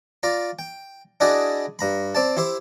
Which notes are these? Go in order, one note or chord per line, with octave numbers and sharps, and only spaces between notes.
F4 D5 A#5
G5
D4 E4 F#4 G#4 D5 D#5
G2 A#5 B5
C4 D5 A5
E4 G4 C5 E5